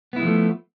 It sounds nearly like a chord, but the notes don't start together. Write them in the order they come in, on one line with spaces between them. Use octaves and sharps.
B3 E4 G#3 F3 A3